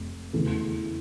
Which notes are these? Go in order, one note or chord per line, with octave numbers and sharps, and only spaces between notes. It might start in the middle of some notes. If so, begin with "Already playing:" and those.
Already playing: F1
E2 C#3 E3 A3